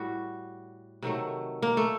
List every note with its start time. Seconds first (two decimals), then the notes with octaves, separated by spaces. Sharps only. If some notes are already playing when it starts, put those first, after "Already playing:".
Already playing: A2 G3 F#4
1.03 C3 D#3 F#3 A3
1.62 A#3
1.77 A3